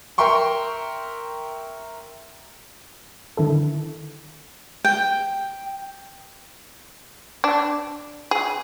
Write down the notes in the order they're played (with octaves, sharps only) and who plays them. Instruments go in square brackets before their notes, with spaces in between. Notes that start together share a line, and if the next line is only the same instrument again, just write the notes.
[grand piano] A#4 E5 G5 C6 C#6
[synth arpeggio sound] D3 D#3 E4 A4
[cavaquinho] G5
[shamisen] D4
G#4